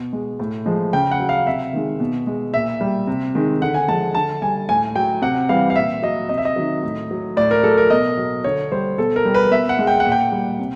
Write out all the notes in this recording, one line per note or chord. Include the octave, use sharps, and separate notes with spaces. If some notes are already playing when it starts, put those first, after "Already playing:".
Already playing: B2
G#3
A2
F3 G#3
C#3 G5
F#5
F#3
F5
C3 E5
D#3 G#3
B2
G#3
A#2 E5
G3
C3
D#3 G#3
D3 F#5
G#5
F3 G#3 A5
D3 A5
G3 G#5
A2 G#5
F#3 G5
C3 F#5
E3 G3 F5
F5
A#2 E5
F#3 D#5
C3 D#5
E5
D#5
D#3 F#3
A2
F#3
A2 D5
A#4
F#3 A4
A#4
B2 D#5
F#3
D3 C#5
G3 C5
B2 A4
A#4
G3
B4
B2 E5
F#5
G#3
G5
A#2 F#5
G5
G3
C3